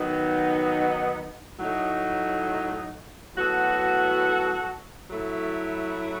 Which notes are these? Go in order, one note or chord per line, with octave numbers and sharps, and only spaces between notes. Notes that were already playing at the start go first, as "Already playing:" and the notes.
Already playing: D#3 F#3 B3 D#4
A2 F#3 A3 D#4
A2 F#3 B3 F#4 A4
F#3 A3 E4